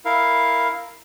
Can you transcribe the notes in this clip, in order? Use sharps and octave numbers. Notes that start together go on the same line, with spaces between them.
E4 A#4 F5